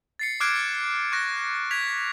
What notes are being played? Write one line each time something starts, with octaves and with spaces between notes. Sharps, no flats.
A6 C7 C#7
D6 F6 F#6 G#6 C7 D7
C#6 F#6 A#6
G#6 B6 F7